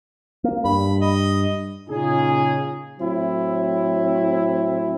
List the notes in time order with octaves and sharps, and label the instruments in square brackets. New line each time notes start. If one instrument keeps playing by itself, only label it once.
[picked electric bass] A#3
[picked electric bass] G2 [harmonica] B5
[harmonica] D#5
[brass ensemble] A#2 C#3 C#4 D#4 F4 G#4
[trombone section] A2 F#3 C4 E4